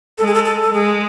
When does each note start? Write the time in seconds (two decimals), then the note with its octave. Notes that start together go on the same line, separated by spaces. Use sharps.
0.18 G#3 A4
0.27 G#4
0.34 A4
0.45 A4
0.62 A4
0.73 G#3 G#4